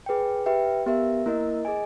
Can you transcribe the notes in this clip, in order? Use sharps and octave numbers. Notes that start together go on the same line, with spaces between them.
G#4 B4 G5
G4 B4 E5 G5
B3 G4 A#4 E5
A#3 E4 A#4 D#5
G#4 D#5 G#5